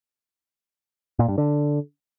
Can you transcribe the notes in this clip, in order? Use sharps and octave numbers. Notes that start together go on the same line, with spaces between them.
A#2
G2
D3